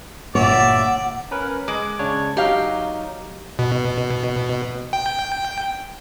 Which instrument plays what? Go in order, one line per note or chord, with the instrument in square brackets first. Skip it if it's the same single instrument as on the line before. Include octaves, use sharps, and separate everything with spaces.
[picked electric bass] G1 A#2 [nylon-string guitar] C#5 [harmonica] D5 E5 [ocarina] F#5
[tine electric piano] C#4 A#4 B4
[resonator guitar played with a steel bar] G#3 [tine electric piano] D6
[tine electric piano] C#3 D4 C#5
[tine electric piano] F#3 D#4 [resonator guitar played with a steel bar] G4 F5
[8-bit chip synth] B2
G5